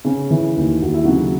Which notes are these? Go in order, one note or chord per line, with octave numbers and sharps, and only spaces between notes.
C#3 C#4
E3
D#2
D#2 F#4
E4
C#3 F#3 F#4